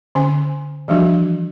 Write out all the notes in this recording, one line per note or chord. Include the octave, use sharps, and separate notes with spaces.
D3 C#4 G#5
E3 F3 G3 D4 F#4